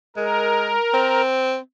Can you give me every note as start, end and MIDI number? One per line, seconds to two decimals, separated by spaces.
0.16 0.74 56
0.16 1.22 70
0.93 1.57 60